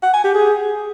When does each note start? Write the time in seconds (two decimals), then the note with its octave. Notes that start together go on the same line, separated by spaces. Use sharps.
0.03 F#5
0.14 G#5
0.24 G4
0.35 G#4